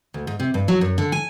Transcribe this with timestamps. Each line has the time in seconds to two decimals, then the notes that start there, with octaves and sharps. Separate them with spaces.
0.14 D2
0.27 G#2
0.40 C3
0.54 G2
0.68 F#3
0.81 F#2
0.98 D3
1.12 G#5